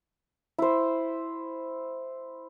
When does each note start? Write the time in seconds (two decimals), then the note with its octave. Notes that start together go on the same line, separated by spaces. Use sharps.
0.59 E4 C5